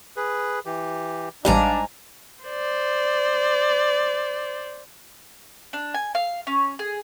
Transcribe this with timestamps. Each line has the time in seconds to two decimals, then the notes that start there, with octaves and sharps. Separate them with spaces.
0.17 G#4 B4
0.66 E3 G4
1.45 A1 G#2 G3 D4 F5 G#5 A#5
2.44 C5 D5
5.73 D4
5.94 G#5
6.15 F5
6.47 C#4
6.79 G#4